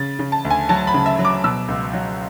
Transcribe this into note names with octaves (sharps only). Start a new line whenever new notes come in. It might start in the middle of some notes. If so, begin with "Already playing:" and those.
Already playing: C#3 A6
C#3
A5
D2
G#5
F#3 A5
B5
C#3
E5
F#3
D6
B2 E6
C#2
F#3